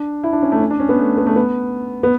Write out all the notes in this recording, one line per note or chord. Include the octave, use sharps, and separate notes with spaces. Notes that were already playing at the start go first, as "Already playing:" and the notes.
Already playing: D4
E4
D4
C#4
A3
C#4
D4
C#4
B3
A3
B3
A3
B3
B3